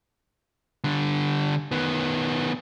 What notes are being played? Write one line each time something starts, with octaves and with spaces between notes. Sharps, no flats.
D3 G3
D#3 B3